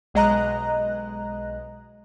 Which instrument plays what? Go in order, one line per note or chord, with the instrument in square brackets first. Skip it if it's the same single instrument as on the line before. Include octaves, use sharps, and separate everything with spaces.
[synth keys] B1 G#3 D#5 A#5 F#6